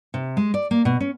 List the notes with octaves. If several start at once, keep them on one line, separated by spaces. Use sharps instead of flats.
C3
G#3
D5
A#3
B2
C#4